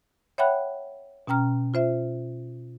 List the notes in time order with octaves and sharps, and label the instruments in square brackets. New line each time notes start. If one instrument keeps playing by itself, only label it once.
[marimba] C#5 E5 F#5 G5 B5 F#6
B2 C#4 G5 A#5 F6
F4 C5 E5